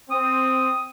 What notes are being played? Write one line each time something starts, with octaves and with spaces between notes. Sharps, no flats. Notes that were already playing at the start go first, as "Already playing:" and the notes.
C4 D#6